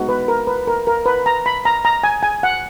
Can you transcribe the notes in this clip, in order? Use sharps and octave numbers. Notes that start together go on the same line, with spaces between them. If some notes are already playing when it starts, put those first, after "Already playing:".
Already playing: G#3 B3 D#4 F#4
B4
A#4
B4
A#4
A#4
B4
A#5
B5
A#5
A#5
G#5
G#5
F#5